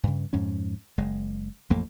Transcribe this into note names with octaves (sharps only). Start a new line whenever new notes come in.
G2 C#3
F2 G#2 C#4
F#1 G#3
A1 F2 A3 A#3